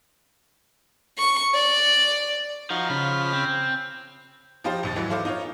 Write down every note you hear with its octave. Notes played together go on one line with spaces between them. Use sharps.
C#6
D5
F3 D#4 F#4 F5
C#3 B5 F6
C4
F3 D#4 F4 G4 C5
A#1 D#2 A6
G#2 E3 F#3
E4 A4 C5 F5 D6
D#4 F4 C#5